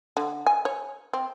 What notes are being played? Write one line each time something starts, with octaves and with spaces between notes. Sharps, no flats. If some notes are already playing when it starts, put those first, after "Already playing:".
D3
G#5
C#5
C4